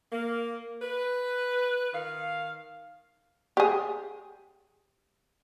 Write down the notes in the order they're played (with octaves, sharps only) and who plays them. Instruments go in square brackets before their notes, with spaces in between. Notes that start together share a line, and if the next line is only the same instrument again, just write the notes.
[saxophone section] A#3
B4
D#3 F5
[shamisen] G4 G#4